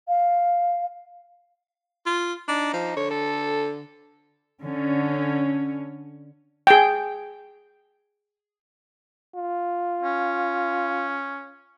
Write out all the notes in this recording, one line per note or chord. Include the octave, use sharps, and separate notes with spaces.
F5
F4
D4 D#4
F3
D3 C#5
A4
D3 C#4
G#4 G5
F4
C#4